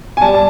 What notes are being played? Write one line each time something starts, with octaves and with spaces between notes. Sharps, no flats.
G#5
G3 A5
A5